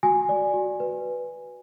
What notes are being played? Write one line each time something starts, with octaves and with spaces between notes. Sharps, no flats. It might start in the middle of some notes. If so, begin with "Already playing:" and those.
F#4 G#5
D5
F#4
B4